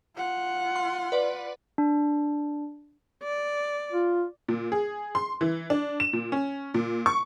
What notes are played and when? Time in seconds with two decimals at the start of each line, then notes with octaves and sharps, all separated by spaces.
0.16 F4 F#5
0.76 C6
1.12 B4 D5
1.78 D4
3.23 D5
3.92 F4
4.48 A#2
4.72 G#4
5.15 C6
5.41 E3
5.70 D4
6.00 E7
6.13 A#2
6.32 C#4
6.74 A#2
7.06 C#6